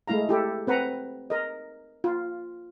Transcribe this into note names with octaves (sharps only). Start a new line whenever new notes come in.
G#3 A3 E4 F5 A#5
E4 G4 A4
C4 B4 F#5 A#5
A#4 D#5
F4